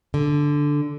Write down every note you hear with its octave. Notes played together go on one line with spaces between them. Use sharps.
D3